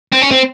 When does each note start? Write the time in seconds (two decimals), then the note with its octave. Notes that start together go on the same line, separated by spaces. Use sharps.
0.12 C4
0.22 C#4
0.31 C4